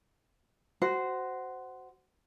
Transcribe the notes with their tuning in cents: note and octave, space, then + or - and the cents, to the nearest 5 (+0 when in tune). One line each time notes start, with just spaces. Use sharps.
F#4 +10 C5 -10